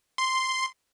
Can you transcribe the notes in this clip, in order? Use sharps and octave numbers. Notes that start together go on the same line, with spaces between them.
C6